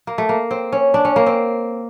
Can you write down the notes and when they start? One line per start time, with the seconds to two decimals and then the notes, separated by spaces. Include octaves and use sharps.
0.07 A#3
0.18 A3
0.29 A#3
0.51 C4
0.73 C#4
0.94 D4
1.05 C#4
1.16 A#3
1.26 C4